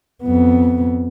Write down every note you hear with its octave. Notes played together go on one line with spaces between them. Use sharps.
F2 B3